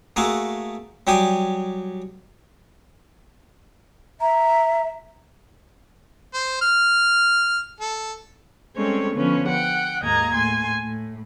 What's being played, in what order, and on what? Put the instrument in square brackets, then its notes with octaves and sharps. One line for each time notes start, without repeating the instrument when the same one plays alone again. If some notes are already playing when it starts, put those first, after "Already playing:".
[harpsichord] A3 A#3 F#4 G#4 A4
F#3 G3 G4 G5 G#5 D#6
[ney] E5 [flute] A#5
[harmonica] C5
F6
A4
[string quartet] G3 G#3 C4 C#4 A4 C#5
D3 F3 B3 C#4
F#5 G5 F#6
D#2 G#2 A#3 D#5 A#5 G#6
A2 G#5 C6
A2